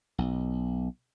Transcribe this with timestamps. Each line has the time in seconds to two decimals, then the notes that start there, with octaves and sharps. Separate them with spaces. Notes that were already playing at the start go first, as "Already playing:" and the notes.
0.18 B1